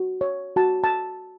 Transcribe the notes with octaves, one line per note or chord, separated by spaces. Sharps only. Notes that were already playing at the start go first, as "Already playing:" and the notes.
Already playing: F#4
C#5
F#4 A5
A5